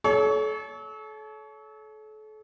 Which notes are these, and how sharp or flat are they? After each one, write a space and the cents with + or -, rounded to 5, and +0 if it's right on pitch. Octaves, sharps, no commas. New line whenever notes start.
A4 -35 C#5 +25